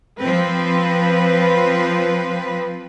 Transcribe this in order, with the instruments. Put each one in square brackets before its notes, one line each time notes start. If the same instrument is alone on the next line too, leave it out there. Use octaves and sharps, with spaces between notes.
[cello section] F3 C4 B4